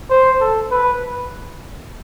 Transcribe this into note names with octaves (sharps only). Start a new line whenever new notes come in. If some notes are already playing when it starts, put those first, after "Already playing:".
C5
A4
B4